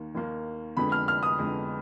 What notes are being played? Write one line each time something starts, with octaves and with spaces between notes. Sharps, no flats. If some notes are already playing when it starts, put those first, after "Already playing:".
Already playing: D#2 D#3 A#3
D#2 D#3 A#3
F2 D3 G#3 B3 B5
F6
F6
D#6
F2 D3 G#3 B3